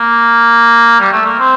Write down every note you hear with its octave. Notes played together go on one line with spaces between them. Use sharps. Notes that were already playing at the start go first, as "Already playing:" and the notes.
Already playing: A#3
G3
A3
A#3
C4